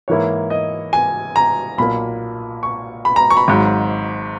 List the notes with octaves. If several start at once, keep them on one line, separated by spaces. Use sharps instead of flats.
G#2 E3 A#3 E4 C#5
D#5
G#5
A#5
B1 A#2 A#3 B5
C#6
B5
A#5
C#6
B5
G#1 G#2 F#3